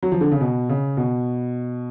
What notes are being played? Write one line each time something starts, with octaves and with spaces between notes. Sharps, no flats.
F#3
F3
D3
C#3
B2
C#3
B2